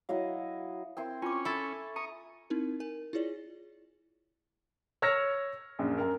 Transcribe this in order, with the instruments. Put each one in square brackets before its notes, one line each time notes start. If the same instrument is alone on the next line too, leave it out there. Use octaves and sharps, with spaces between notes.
[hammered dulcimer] F#3 E4 D#5 F5
[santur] C4 E4 C6 [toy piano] A#4
[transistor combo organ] C#4 [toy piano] F4 D6 [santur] G#5 C#6
[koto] E4 A4
[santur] A#5 [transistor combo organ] C#6 D#6
[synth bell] C4 D#4 E4 A#4
A#4 G#5
E4 F4 G#4 C#5 D5
[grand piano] C#5 E6 F6 G#6 A#6 C#7
A#1 F#2
F#2 A#4